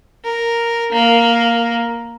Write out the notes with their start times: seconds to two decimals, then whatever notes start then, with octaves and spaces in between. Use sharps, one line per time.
0.24 A#4
0.92 A#3